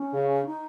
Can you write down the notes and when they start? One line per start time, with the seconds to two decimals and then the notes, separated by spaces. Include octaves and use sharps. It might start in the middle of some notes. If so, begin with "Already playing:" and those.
Already playing: C#4
0.13 C#3
0.46 D#4